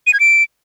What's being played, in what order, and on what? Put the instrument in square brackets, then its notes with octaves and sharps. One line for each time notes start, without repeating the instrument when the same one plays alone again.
[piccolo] D#7
G#6
D7